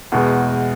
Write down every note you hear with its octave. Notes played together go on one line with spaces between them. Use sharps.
E2 B2 G#3